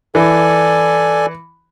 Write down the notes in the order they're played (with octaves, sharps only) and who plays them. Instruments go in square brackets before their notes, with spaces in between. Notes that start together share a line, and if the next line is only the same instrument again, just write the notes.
[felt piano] E3 [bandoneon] A4 D5 G#5